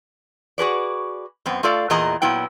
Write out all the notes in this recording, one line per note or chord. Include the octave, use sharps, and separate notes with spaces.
F#4 G#4 B4 D5
F#2 B3 C4
A3 F4 A4 D5 F5
E2 A#2 E3 G#4 D#5 A#5
A#2 F#3 B3 E4 G5